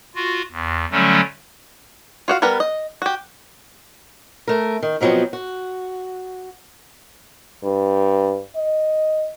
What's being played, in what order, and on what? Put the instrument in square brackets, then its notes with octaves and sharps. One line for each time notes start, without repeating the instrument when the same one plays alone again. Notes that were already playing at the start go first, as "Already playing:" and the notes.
[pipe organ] F4 F#4
E2
D3 F#3 G3 A3 C#4
[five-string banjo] F4 F#4 F5
G3 B3 A#4 B4
D#5
F#4 G4
[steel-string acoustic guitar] A3 A#4
D#3
B2 F3 F#3 B3 C4
F#4
[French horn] G2
D#5